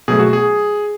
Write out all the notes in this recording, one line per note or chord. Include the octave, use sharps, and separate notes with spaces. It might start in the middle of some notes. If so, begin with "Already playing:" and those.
B2 F#3 A3 G#4
F#4
G#4